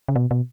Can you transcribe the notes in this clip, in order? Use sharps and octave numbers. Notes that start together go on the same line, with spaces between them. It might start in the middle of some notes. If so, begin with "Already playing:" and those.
C#3
B2
B2